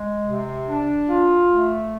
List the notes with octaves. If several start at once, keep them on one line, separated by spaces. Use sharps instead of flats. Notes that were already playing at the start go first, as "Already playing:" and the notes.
Already playing: G#3
C3
D4
F4
A3